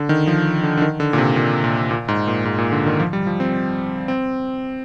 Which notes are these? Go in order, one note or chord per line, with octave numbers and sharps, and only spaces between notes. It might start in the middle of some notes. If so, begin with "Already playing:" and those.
Already playing: D3
D#3
F3
D3
D3
D#3
D3
A#2
C3
A#2
A#2
A#2
G#2
A#2
G#2
A#2
D3
D#3
F3
G3
F3
C4
C4